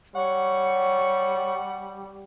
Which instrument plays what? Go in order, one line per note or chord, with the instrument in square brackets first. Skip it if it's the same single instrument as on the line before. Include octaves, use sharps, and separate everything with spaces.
[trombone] G3 [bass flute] C#5 [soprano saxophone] F#5 [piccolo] C#6